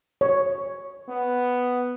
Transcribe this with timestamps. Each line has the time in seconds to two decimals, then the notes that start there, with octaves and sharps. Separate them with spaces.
0.21 C#5
1.08 B3